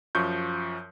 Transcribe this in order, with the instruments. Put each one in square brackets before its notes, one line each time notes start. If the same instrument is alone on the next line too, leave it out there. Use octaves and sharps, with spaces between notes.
[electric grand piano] F#2 F3 C#6 G6